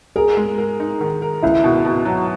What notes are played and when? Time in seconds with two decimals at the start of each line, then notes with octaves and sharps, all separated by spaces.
0.16 G#4 A#4
0.37 G#3
0.58 A#4
0.80 D#4
1.01 D#3
1.22 A#4
1.43 C#2 E4
1.64 B2
1.85 B2
2.05 F#3